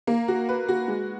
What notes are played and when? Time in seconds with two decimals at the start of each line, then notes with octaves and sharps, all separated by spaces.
0.07 A#3
0.28 F#4
0.49 B4
0.68 F#4
0.88 G#3